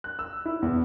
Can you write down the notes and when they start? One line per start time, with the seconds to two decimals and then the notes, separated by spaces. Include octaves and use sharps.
0.04 F#6
0.19 E6
0.45 E4
0.62 E2